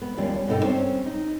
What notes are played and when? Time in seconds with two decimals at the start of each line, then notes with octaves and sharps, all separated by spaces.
0.02 B3
0.17 D#2 F3 G3 C#4
0.47 G2 B2 A3 D#4 A4 G5
0.62 G3 C4 C#4 C5
1.06 D#4